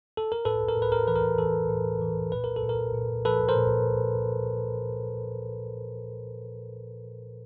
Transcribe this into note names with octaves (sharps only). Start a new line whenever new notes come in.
A4
A#4
A2 A4 B4
A#4
A2
B4
A#4
E3 B4
A#4
E3 A4
A2
E3
A#2 B4
A#4
A4
A#2
A#4
A#2
F3 A4 B4
A#4 C5
A#2